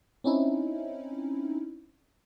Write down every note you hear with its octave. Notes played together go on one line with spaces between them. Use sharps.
C4 C#4 D#4 E4